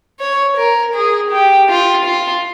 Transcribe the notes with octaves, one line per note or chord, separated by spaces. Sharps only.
C#5
A#4
G#4
G4
F4
F4